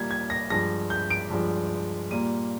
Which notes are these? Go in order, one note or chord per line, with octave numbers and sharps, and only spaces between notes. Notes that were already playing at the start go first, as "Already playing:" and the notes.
Already playing: A#2 G3 A#3 G#6
G#6
A#6
G2 F3 G#3 A#6
G6
D7
G2 F3 G#3
A#2 G3 A#3 D#7